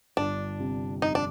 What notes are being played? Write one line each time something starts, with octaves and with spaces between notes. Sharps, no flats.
G1 D4
C3
F2 D#4
D4